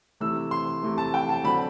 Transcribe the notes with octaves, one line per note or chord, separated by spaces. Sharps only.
C3 E3 A3 E6
C6
C3 E3 A3
A5
G5
A5
D3 F#3 C4 B5